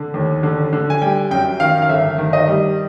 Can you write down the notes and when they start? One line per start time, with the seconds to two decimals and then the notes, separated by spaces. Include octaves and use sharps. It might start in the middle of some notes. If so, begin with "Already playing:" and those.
Already playing: D3
0.14 D#2
0.43 D3
0.73 D3
0.90 G#5
1.02 G3 G5
1.31 F#2 G5
1.60 D#3 F5
1.82 F5
1.89 G1 E5
2.18 D#3
2.33 D#5
2.47 G3